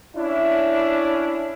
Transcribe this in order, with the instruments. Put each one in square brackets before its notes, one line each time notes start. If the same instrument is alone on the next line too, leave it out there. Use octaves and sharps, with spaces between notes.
[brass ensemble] C#4 D4 E4